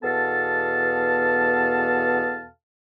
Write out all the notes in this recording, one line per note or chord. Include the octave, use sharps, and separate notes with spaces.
E2 B2 B3 A4 F5 A5